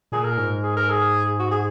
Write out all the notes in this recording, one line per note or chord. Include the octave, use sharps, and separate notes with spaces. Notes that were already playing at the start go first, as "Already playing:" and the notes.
A#2 G#4
A#4
G#2
G#4
A#4
G#4
F#4
G#4